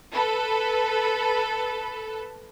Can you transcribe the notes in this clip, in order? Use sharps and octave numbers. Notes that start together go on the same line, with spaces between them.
A4 B4